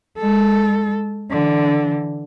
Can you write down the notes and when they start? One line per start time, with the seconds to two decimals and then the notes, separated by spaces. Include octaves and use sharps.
0.18 G#3 A4
1.30 D3 E3